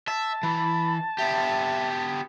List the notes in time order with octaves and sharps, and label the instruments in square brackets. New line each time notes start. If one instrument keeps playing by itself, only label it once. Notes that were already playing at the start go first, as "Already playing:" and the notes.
[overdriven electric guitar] E5 [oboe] A5
[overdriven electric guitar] E3 [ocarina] B5
[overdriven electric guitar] B3 G4 [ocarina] E5